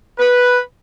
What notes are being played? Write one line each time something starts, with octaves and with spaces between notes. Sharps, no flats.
B4